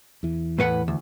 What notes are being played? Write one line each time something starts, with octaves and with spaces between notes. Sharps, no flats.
E2 E3
A2 B4 F#5
D2